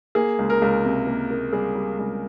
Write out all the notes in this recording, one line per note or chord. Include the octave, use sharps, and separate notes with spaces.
A#3 G#4
C#2
A#4
C#2
C3
A#3
A#3
G3 G#4
G3
C#2